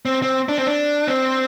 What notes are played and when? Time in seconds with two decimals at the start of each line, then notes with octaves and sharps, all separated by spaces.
0.05 C4
0.22 C4
0.49 D4
0.58 C4
0.67 D4
1.08 C4